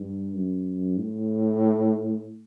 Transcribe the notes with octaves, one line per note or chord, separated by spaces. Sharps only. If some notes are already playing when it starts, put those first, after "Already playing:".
Already playing: G2
F#2
A2